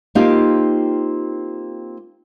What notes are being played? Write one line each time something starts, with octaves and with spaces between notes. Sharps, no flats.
A#3 C4 D#4 F4 G4